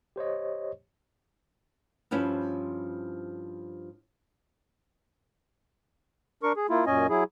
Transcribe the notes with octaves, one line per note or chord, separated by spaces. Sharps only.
G4 C5 C#5 D#5
G2 F3 C#4 E4 C5
D4 A#4 C#6
G#4
A#3 E4 F4
F#2 A#2 C#4 D#5 G#5
F#3 E4 G#4